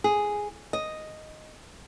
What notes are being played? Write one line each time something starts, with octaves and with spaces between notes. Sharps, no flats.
G#4
D#5